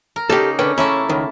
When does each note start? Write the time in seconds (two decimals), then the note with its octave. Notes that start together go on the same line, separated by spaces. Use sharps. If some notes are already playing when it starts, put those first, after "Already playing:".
0.16 A#4
0.30 C#3 A#3 D#4 G4 A4
0.59 D3 C#4 B4 G5
0.78 A3 A#3 C#4 E4
1.09 C#2 D#3